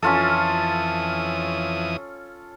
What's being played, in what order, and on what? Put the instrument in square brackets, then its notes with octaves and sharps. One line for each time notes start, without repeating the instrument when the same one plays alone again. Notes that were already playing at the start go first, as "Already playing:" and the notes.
[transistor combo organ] F2 E3 D#6 [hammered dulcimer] C#4 F4 A4